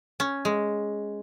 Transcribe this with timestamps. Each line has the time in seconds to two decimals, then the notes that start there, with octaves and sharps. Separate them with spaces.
0.20 C#4
0.45 G#3